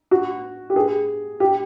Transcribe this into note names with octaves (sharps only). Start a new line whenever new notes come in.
F#4
G4
G#4
G4